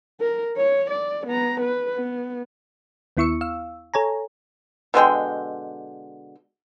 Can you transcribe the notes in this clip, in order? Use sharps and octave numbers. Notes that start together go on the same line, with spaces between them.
A#4
C#5
D5
B3 A#5
B4
B3
D#2 B3 E4 C#6 E6 C#7
F5 E6
A4 C#5 G#5 A#5
B2 D3 G#3 G5